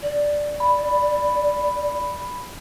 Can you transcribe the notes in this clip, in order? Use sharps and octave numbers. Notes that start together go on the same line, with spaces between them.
D5
B5